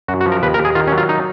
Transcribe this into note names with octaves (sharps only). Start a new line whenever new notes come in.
F#2 F#4
F#4
F3
A#4
D#2 B4
A#4
D#2
G#4
D#3 F4
C#4
F#3
F4
D#4